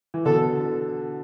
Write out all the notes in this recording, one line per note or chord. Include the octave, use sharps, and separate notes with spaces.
E3
B2 D3 A4